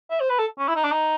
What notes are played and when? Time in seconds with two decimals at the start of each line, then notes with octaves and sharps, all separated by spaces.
0.10 E5
0.20 C5
0.30 B4
0.39 A4
0.58 C#4
0.68 E4
0.75 D#4
0.84 D4
0.92 D#4